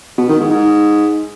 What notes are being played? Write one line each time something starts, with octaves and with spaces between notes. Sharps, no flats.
B2
D#3
G#2
G#2